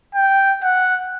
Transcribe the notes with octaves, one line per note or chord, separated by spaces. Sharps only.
G5
F#5